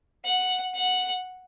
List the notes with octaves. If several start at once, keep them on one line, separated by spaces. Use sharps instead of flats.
F#5
F#5